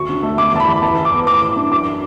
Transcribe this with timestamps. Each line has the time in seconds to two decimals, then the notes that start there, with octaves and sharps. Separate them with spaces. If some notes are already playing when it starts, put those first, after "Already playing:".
Already playing: D2 C#6
0.09 D3
0.23 A3
0.38 A3 D6
0.53 E2 A5
0.60 B5
0.68 E2
0.82 E3 A5
0.98 E3
1.05 D6
1.12 B3
1.27 A2 D6
1.42 E3
1.56 D4
1.71 F#2 D6